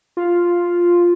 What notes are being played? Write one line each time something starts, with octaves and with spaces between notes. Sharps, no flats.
F4